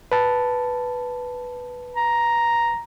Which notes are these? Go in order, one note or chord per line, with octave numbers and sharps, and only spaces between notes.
B4 A5
A#5